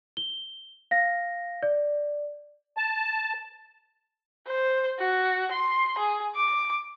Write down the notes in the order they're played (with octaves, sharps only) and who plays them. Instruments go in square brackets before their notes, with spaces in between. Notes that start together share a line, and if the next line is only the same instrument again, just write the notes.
[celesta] G7
F5 A#6
D5
[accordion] A5
[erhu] C5
F#4
C6
G#4
D6